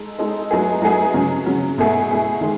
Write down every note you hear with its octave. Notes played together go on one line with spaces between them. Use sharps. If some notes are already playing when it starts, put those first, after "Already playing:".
Already playing: G#3 D#4 A4
G#3 D#4 A4
F#3 A3 D#4 G#4 B4
F#3 A3 D#4 G#4 B4
C#3 F#3 C#4
C#3 F#3 C#4
B2 A3 E4 G#4
B2 A3 E4 G#4
D#3 G#3